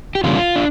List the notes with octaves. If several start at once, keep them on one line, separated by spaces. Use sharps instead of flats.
G4
E2 C#3 G3 A#3 D4 F4
D4